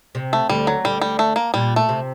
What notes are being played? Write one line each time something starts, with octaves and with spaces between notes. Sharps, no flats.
C3
A3
D2 D3 G3
F#3
D2 D3 G3
G3
A3
A#3
A#2 G3
A3
C3